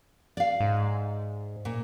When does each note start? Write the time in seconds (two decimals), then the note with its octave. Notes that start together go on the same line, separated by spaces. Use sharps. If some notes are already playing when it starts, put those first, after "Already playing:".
0.37 D5 F5
0.60 G#2
1.65 A#2